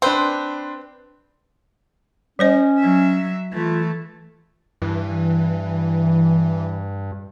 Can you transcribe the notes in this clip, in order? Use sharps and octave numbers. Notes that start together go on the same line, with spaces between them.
C4 D4 B4 C6
G3 C#4 C5 D#5
F#3 E5
E3 A3 F4
G2 E3